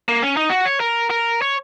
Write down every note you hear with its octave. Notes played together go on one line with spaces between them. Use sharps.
A#3
C#4
D#4
F#4
C#5
A#4
A#4
C#5